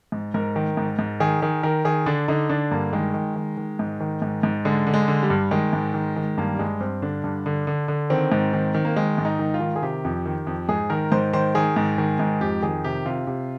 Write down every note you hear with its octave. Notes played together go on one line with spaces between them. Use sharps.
G#2
G#2 A#4
D#3
G#2
G#2
D#3 G#4
D#3 G#4
D#3 A#4
D#3 G#4
D3 D4
D3 D#4
D3 D4
G2 A#3
D#3 G#3
D#3
D#3
D#3
G#2
D#3
G#2
G#2
D3 G#3
D3
G#3
D3
G3
G2
D#3 G#3
G#2
D#3
D#3
G2 A#3
G3
G2 G#3
G2 C4
D3 D4
G2
D3
D3
D3
D#3 C4
G#2
D#3
D#3
A#3
D#3 G#3
G#2
D#4
D#3
F4
D#3
G#4
C3 G4
F2
D#3
F2
G#2 G#4
D#3 A#4
G#2 C5
D#3 C5
D#3 G#4
G#2
D#3
G#2
F2 G4
D#3 G#4
C3 G4
C3 F4
C3